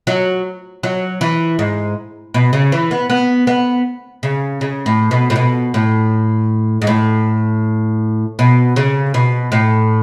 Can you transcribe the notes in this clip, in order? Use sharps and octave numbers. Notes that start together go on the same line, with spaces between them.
F#3
F#3
E3
G#2
B2
C#3
E3
B3
B3
B3
C#3
C#3
A2
B2
A2
B2
A2
G#2
A2
B2
C#3
B2
A2